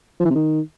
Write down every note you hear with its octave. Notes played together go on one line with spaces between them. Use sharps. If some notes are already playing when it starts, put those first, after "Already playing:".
F3
E3
C3
D#3